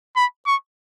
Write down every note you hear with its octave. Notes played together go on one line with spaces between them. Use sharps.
B5
C#6